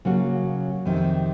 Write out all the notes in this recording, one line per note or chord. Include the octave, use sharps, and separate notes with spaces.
C#3 F#3 A#3 C#4 F#4
F2 C3 D#3